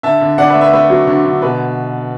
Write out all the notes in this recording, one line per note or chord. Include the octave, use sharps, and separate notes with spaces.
D3 E5 A5
D3
D3 D5 F#5
B4 E5
A3
B4 E5
A3 B4 E5
F#3
D3
D3
B2 B4